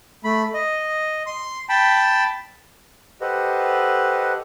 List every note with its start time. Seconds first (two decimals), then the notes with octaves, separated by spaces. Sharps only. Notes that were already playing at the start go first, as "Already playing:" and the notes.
0.24 A3 B5
0.54 D#5
1.26 C6
1.69 G5 A5 B5
3.21 G4 A4 B4 C5 D#5 F#5